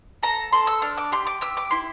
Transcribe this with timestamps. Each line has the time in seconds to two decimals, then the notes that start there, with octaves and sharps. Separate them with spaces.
0.23 A4 A#5
0.53 A4 C6
0.67 E6
0.82 D4 F6
0.98 D6
1.12 G4 C6
1.27 D6
1.41 G4 E6
1.57 D6
1.71 E4 C6